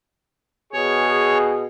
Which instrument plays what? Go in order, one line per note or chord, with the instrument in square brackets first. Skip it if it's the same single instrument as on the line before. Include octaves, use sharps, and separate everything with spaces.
[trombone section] B2 G#4 [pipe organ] C#5